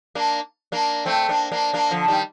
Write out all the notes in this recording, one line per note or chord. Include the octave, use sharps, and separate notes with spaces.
A#3 D4
A#3 D4
A3 C4
A#3 D4
A#3 D4
A#3 D4
D3 F3
D#3 G3